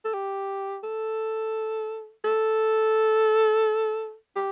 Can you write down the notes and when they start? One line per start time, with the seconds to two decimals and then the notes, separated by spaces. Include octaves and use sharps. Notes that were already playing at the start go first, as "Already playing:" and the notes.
0.05 A4
0.14 G4
0.84 A4
2.25 A4
4.36 G4